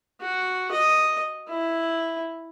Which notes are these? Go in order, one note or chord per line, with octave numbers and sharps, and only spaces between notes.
F#4
D#5
E4